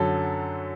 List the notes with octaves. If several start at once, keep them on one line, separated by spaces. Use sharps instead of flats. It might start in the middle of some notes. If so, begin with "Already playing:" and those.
Already playing: F#2 D3 F#3 A4